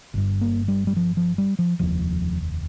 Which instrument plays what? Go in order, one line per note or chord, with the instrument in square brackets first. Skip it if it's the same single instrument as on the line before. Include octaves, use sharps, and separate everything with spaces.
[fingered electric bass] G1 G2
A#3
G3
G3
F3
F3
G3
F3
F1 D#2 F3